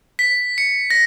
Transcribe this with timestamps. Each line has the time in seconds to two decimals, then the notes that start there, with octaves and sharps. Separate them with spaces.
0.19 B6
0.58 C#7
0.90 A#6